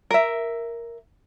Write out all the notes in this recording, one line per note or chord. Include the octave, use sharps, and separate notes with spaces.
A#4 E5